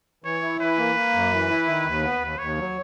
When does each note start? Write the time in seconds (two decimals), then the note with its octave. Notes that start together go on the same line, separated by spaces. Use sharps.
0.24 E3 C#5
0.42 E4
0.60 E3 B4
0.78 A#3
0.96 A#3
1.14 F#2
1.32 E3
1.49 E4
1.68 D#3
1.86 D#2
2.03 B3
2.21 D#2
2.39 D#2 C#5
2.57 F#3